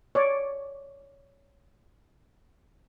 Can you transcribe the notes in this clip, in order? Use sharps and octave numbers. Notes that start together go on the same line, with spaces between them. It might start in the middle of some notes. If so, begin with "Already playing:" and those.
C#5 D5